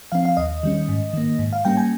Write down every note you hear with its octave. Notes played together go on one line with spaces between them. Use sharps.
F3 C4 F5
F5
D#2 D#5
D#3 G3 C#4
G#2
D#3 A#3
G#2
F5
G3 A#3 C#4 G5
G#5